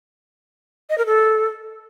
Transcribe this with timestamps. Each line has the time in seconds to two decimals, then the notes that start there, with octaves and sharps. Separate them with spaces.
0.90 D#5
0.98 A#4
1.06 A4